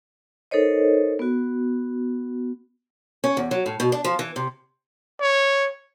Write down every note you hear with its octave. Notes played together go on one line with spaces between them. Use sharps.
D#4 A4 A#4 C5 C#5 D#5
B3 F#4
C#4
E2
F#3
A2
B2
D4
F3
E3
C3
C#5